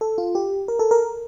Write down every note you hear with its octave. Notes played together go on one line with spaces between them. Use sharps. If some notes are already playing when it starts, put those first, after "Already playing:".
A4
F4
G4
A#4
A4
A#4